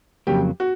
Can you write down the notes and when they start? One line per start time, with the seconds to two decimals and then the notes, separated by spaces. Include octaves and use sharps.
0.27 F2 C#3 F#3 A#3 G4
0.60 F#4